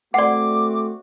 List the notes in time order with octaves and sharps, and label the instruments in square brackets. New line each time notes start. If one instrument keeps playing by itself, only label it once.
[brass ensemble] A3 C4 F#4 [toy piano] D5 F#5 [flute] D6